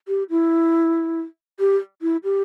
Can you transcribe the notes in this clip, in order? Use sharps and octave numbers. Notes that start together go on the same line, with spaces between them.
G4
E4
G4
E4
G4